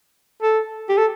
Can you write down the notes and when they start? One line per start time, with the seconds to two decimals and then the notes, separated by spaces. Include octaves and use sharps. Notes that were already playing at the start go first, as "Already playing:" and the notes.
0.43 A4
0.89 G4
0.98 A4